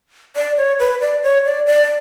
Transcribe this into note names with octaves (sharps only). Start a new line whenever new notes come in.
D5
C#5
B4
D5
C#5
D5
D5